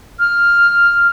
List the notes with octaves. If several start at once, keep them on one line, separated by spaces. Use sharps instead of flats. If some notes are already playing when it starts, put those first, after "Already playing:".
F6